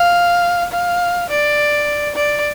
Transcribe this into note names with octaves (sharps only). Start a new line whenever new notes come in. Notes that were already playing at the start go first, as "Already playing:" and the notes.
Already playing: F5
F5
D5
D5